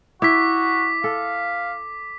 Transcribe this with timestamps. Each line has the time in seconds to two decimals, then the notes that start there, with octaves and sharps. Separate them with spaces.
0.22 E4 F#4 D6 B6
1.04 A4 F5